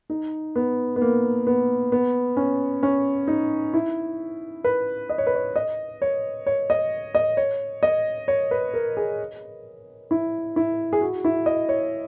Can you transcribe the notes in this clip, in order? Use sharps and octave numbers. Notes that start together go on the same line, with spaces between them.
D#4
B3
B3
A#3
B3
B3
C#4
C#4
D#4
E4
B4
D#5
C#5
B4
C#5
D#5
C#5
C#5
D#5
D#5
C#5
D#5
C#5
B4
A#4
G#4
E4
E4
G#4
F#4
E4
D#5
C#5